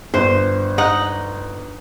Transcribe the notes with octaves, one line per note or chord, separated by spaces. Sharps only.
G1 C5
D#4 F#5